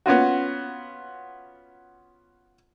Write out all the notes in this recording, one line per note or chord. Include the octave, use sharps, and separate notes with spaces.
B3 C#4 F4 F#4